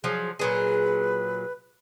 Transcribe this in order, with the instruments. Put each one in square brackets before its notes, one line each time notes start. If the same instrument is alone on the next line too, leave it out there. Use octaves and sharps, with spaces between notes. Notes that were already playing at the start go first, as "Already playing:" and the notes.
[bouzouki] F3 F#3 [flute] G#4
[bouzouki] A#2 F#3 G#4 [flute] B4